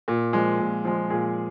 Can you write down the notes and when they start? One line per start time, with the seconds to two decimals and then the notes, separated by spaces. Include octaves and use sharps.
0.08 A#2
0.33 F3 G#3
0.59 A#2
0.85 F3 G#3
1.10 A#2 G#4